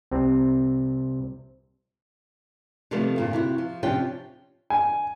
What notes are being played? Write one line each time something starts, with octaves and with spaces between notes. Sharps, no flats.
C2 C3 C4
C3 D#3 F3 G3 A3 B3
G2 A#2 D3
C3 E4 F#4
F3
C3 F3 C#4 D4 G4 G5
G#5